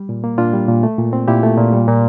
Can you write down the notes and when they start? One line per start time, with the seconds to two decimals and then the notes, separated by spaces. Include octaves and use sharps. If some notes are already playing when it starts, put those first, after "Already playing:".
Already playing: G3
0.09 A#2
0.24 A#3
0.38 A#2 D4 F4
0.53 G3
0.68 A#2
0.83 A3
0.98 A#2
1.13 C4
1.28 A#2 E4 G4
1.43 A3
1.58 A#2
1.73 G3
1.88 A#2